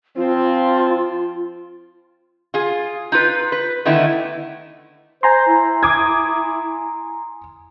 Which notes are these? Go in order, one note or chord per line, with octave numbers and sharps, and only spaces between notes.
F3 C4 F4
F4 G#4
D#4 F4 B4
B4
D3 D#3 A3 B3 D#4 E4
C5 G#5 A#5 C6
E4
D6 D#6 G#6